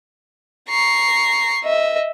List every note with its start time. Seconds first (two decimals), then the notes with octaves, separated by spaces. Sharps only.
0.69 A#5 C#6 C7
1.64 D#5 E5